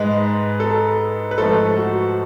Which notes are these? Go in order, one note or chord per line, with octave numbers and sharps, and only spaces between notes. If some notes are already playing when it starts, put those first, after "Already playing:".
Already playing: G#2 G#3 B4
A4
B4
G#2 F3 A3 A4
F#4